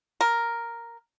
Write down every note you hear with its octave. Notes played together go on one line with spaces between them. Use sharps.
A#4